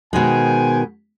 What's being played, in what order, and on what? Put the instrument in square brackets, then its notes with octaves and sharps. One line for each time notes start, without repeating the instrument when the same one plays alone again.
[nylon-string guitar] B2 D#3 G#3 [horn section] C5 G5 G#5